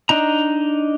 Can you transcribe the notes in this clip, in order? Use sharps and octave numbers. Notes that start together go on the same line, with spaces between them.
D4 D#4 A#5